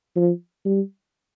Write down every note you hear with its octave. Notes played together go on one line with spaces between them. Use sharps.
F3
G3